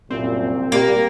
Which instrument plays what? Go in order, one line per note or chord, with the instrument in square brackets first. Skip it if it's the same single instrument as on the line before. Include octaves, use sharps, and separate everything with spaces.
[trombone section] C2 F#2 A#2 [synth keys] C4
[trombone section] G3 G4 [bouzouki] A#3